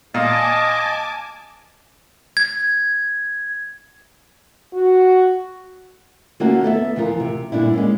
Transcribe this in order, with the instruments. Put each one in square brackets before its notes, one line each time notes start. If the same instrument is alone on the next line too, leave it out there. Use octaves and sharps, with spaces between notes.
[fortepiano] A#2 [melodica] D#5 [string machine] G#5 A5 D6
[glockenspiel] G#6
[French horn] F#4
[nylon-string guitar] D3 A3 A#3 C#4 F4 F#4
B3 A4 D5 E5
D2 E3 F3 F4 A#4
C3
G2 A#2 D3 D4 E4
G#3 A#3 C#4